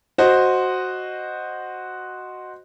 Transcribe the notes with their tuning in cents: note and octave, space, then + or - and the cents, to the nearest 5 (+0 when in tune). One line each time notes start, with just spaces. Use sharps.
F#4 +0 C5 +0 D#5 -5